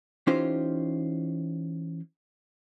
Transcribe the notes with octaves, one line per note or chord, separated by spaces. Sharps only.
E3 C#4 D#4 F4 G4 C5